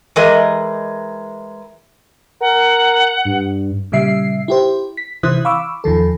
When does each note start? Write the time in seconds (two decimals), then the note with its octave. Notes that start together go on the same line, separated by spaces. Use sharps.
0.16 E3 G#3 A#4 D#5
2.41 A#4 F#5
3.25 G2
3.92 A#2 C#3 G3 E5 C7
4.48 E4 G4 C5
4.97 B6
5.23 C3 E3 E4 C5 D#6 F#6
5.45 F5 B5 C#6 D6 E6
5.84 E2 D#3 F3 A4